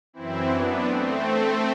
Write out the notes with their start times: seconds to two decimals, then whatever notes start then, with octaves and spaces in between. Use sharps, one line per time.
0.13 F#2 E3 C4 E4
0.48 B3 D4
0.84 A3 C4